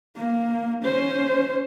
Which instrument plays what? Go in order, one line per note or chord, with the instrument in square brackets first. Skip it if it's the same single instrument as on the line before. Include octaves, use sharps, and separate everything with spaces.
[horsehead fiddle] A#3
C#4 C5